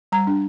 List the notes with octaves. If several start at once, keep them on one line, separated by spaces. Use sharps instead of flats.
G3 A#5
D4